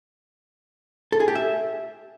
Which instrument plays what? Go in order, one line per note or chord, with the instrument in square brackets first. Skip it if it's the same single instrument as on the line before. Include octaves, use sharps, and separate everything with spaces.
[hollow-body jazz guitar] A4
G#4
G4
E5